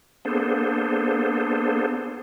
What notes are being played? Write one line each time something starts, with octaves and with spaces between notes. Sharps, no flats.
A#3 B3 D4 G#4 A4 C5